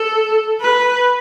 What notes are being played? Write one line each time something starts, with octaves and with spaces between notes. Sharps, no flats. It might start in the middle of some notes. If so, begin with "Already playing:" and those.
Already playing: A4
B4